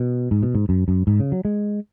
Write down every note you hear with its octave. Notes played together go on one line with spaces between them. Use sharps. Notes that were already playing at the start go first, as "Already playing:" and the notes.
Already playing: B2
G#2
B2
G#2
F#2
F#2
G#2
C#3
F#3
G#3